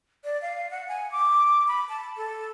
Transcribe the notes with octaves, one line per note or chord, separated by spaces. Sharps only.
D5
F5
F#5
G#5
D6
B5
A5
A4